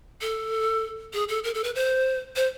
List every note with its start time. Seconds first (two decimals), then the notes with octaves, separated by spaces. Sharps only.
0.21 A4
1.13 G#4
1.29 A4
1.44 A#4
1.54 A4
1.64 B4
1.75 C5
2.36 C5